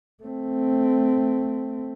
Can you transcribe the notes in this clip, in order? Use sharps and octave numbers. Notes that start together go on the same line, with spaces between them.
A3 C4